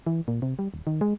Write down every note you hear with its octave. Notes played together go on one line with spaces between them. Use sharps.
E3
A#2
C3
G3
D#1
D#3
G#3